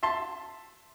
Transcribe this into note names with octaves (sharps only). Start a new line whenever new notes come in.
E5 A5 C6